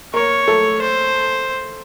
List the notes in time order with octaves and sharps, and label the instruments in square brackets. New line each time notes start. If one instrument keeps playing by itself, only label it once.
[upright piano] A#3 A#4 [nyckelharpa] C#5
[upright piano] A3 A4
[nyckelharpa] C5